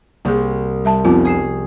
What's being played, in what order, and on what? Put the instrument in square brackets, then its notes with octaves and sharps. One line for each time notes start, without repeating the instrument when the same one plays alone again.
[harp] C2 [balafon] A#3 G#4
[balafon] G3 E5 A5
[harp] F1 [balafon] B3 C4 F4
[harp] G#4 C7 E7